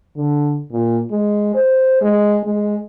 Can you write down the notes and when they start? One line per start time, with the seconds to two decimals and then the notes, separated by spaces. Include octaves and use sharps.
0.16 D3
0.71 A#2
1.11 G#3
1.55 C5
2.01 G#3
2.44 G#3